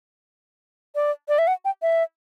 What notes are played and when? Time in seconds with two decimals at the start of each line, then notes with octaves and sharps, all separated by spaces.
0.95 D5
1.29 D5
1.39 E5
1.47 F#5
1.65 G5
1.82 E5